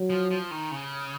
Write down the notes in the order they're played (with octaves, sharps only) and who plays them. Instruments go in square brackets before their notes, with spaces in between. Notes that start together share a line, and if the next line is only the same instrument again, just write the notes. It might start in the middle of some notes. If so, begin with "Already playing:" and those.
Already playing: [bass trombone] F#3
[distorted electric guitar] F3
F3
D#3
C#3